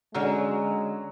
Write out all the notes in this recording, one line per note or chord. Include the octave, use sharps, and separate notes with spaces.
D3 F#3 G#3 C#4 F#4